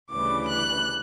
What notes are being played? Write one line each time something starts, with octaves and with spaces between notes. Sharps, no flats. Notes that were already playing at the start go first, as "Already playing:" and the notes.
D2 C#3 E3 G3 D6
F#6